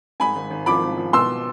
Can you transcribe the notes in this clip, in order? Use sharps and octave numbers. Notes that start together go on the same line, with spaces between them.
G#2 G#5 B5
G#1
G#1
F3 B5 D6
G#1
F3
B2 C6 E6